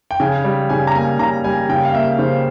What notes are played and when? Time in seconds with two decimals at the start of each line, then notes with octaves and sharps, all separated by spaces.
0.11 G5
0.20 C#3 G#5
0.44 G3
0.69 C#3 G#5
0.87 A#5
0.95 A#3 G#5
1.19 C#3 A#5
1.44 G3 G#5
1.69 C#3 G5
1.85 F5
1.94 A#3 E5
2.19 C#3 C5